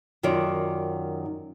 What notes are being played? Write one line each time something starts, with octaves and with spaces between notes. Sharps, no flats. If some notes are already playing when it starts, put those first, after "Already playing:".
F#2 D#3 F4 F#4 D5